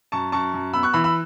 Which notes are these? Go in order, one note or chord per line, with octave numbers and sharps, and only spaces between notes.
F#2 A5 C#6
F#2 A5 C#6
F#2
B3 B5 E6
C#6 F#6
E3 B5 E6
B5 E6